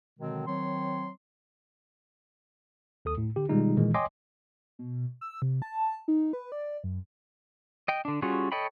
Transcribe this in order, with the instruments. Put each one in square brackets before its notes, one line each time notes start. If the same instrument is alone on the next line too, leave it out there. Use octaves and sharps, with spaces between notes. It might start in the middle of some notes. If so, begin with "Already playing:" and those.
[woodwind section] B2 D3 D#3 F#3 G#3 C4
D#3 F#3 C4 C#5 C6
[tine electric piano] D#2 A4 D#6
A2
D3 G4
B2 D#3 G3 G#3 D#4 F4
A#2 D#3 E3 G#3
C#5 D#5 G5 G#5 C6 D6
[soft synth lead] B2
E6
C3
A5
D#4
B4
D5
F#2
[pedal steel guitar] D#5 G5
D3 D4
G3 C#4 F4 F#4 G#4
A4 C#5 D#5 G5 B5